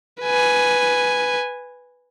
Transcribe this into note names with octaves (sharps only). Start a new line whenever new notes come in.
B4 G#5